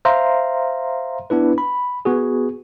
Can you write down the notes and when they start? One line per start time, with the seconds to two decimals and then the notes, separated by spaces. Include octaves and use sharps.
0.05 C5 E5 F5 A#5 C6
1.30 B3 D4 E4 B4
1.58 B5
2.05 B3 F#4 G#4